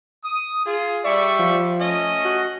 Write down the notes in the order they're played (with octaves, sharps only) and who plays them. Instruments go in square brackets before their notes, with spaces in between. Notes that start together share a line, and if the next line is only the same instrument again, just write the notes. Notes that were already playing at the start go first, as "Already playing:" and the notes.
[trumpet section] D#6
F4 G#4
[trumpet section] G3 E5 C#6 [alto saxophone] D5
[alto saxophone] F3
[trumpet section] A3 C#4 D#5
[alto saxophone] F#4